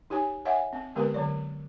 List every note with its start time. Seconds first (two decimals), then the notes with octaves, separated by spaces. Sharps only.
0.10 D#4 G4 C#5 G#5
0.45 C#5 D#5 E5 F#5 G#5
0.73 C4
0.95 D3 G#3 B3 G4 A#4 B4
1.14 D3 F#3 D5